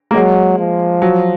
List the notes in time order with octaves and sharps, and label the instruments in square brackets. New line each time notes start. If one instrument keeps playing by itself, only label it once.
[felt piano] A#3
[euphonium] F#3 [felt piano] G#3
[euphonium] F3
[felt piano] F#3